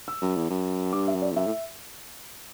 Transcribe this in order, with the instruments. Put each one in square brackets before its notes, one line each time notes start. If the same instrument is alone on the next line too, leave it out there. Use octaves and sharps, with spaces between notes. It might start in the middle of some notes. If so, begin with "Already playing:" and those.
[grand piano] E6
[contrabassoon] F#2
E2
F#2
[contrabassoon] G2 [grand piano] D6
[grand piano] E5
[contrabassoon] F#2
[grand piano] D5
[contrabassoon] E2
[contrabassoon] F#2 [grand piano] E5
[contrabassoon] A2